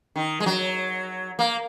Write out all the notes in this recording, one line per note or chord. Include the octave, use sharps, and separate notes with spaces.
D#3
G#3
F#3
A#3